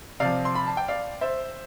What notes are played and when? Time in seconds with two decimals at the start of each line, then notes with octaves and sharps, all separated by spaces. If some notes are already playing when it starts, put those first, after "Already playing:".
0.20 C3 F3 D5 F5
0.45 C6
0.55 B5
0.67 A5
0.77 G5
0.88 D5 F5
1.21 C5 E5